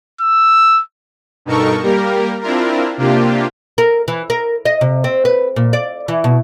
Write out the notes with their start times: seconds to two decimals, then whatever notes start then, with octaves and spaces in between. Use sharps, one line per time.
0.21 E6
1.45 G2 B2 D#4 A4 A#4 C#6
1.83 G3 A#3 G4 A#4
2.42 C4 D4 E4 F4 A#4
2.98 C3 A#3 D4 F4 G4
3.78 A#4
4.08 E3
4.30 A#4
4.65 D#5
4.81 C3
5.04 C4
5.25 B4
5.56 A#2
5.73 D5
6.08 E3
6.24 B2